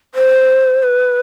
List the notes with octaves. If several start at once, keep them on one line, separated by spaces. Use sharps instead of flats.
C5
B4